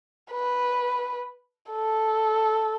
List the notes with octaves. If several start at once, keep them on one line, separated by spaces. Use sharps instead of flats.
B4
A4